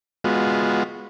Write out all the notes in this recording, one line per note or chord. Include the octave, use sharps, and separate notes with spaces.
G#3 B3 F4 F#4